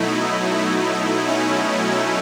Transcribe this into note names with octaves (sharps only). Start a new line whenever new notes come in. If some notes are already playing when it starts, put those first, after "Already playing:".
Already playing: B2 F#3 A3 D#4 E4
C#4